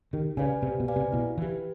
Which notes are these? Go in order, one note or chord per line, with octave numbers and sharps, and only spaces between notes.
D#3 G4
C#3 B4 D5 F5 G#5
C3 G4
B2
B4 D5 F5 G#5
C3
B2 E4
E3 G4 B4